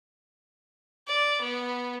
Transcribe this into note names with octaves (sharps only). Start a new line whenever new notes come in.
D5
B3